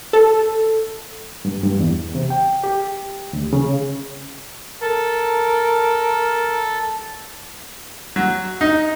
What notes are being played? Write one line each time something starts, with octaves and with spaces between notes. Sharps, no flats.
A4
G2
G2
E2
C3
G5
G4
D2
C#3
A4 A#4
F#3
D#4